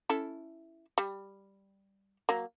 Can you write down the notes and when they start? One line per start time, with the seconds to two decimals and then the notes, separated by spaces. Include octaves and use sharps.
0.10 C#4 E4 A4
0.98 G3
2.29 F#3 A#3